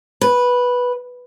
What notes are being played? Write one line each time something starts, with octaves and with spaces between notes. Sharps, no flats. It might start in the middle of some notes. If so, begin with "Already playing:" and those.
B4